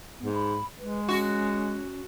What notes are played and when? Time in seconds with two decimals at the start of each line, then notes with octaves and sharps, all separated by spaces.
0.20 G#2 B3
0.34 B5
0.79 G#3 B4
1.09 C#4 F#4